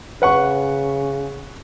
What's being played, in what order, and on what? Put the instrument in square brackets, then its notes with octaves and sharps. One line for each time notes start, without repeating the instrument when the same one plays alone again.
[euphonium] C#3 [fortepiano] B4 F#5 C#6